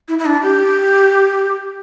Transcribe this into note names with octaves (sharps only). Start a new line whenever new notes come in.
E4
E4
D4
G4